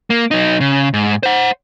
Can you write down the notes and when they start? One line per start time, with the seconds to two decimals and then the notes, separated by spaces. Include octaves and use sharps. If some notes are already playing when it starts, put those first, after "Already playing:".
0.10 A#3
0.31 F#3 D#4
0.61 C#3
0.94 G#2
1.23 C5 F#5